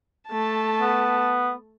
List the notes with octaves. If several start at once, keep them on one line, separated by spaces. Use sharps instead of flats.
A3 A5
B3